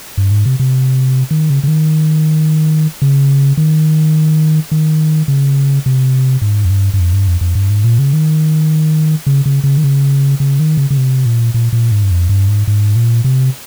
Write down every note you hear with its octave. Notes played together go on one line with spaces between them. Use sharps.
G2
G#2
C3
C3
D#3
C#3
C#3
D#3
C#3
D#3
D#3
C#3
C3
G#2
F2
G2
G2
F2
G2
F2
F2
G2
G#2
A#2
C#3
D#3
C#3
C#3
C#3
D#3
C#3
C#3
D#3
C#3
C#3
C3
A#2
A#2
A#2
G#2
G2
F2
G2
G#2
G#2
A#2
C3